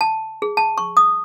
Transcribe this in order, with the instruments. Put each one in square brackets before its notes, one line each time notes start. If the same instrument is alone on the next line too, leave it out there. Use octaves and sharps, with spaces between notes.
[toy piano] A5
G#4
A5
C#6
D#6